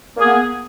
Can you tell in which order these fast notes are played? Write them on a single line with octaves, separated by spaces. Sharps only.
A#3 G#4 B3